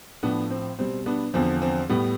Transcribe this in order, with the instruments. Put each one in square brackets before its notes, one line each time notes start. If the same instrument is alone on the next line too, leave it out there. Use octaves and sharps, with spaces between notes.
[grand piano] A2 F3 B3 D4
C4
B2 G3 C4
B3 D4
E2 D3 F3 C4
C4
A2 G3 B3